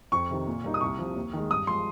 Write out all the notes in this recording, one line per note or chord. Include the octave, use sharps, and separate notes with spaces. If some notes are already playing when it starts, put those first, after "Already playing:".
F2 C#6
C3 D#3
A#2
G3 A#3 D#4
D#6
C2 C#6
C3 F3
D#2
D#3 G#3
G2 D#6
F3 G#3 C6